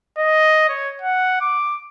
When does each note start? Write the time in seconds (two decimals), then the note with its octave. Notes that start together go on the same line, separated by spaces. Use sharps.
0.18 D#5
0.69 C#5
1.02 F#5
1.41 D6